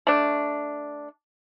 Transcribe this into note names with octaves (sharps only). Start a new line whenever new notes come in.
A3 D4